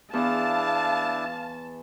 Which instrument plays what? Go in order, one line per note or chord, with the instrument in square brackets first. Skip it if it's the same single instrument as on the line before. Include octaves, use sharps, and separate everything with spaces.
[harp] E2 [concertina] D4 E4 [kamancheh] F5 [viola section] A5